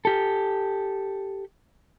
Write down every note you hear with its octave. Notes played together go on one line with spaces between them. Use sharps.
G4 A4